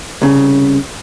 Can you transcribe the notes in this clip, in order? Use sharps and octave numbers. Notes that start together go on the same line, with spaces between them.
C2 C#3